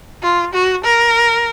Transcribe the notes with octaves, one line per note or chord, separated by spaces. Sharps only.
F4
F#4
A#4